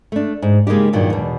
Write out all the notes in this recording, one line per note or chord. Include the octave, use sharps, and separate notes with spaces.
A3 D4
G#2
C#3 G#3 A#3 D#4 G4
G2 A#2 D#3 F#3
E2 B2